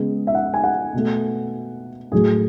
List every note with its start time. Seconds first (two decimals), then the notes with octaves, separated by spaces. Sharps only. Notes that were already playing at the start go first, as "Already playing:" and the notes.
Already playing: C#3 G#3 B3
0.27 E5
0.35 F#5
0.54 G#5
0.64 F#5
0.94 B2 A3
2.12 A2 F#3 A3 G#4